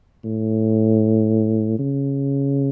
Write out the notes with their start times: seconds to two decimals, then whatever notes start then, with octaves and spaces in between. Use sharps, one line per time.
0.24 A2
1.79 C#3